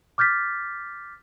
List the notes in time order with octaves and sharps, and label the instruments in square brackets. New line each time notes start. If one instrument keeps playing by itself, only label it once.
[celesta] D6 F6 G6 A6 B6